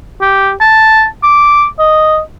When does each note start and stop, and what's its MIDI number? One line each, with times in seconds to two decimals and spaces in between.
0.21 0.51 67
0.61 1.05 81
1.23 1.66 86
1.79 2.19 75